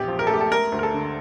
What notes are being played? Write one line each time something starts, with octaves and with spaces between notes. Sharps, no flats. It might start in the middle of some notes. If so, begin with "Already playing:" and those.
Already playing: A#1 E2 G4
F3
A#4
A4
A3 G4
A4
A3 A#4
D2
A#4
A4
D3